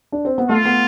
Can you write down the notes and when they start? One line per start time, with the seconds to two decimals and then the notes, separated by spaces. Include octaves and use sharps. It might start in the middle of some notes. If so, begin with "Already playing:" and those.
0.12 D4
0.25 C4
0.38 B3
0.49 A3 F4
0.65 B3